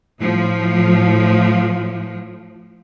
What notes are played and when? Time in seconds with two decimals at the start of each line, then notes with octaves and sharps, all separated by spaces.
0.19 A2 F3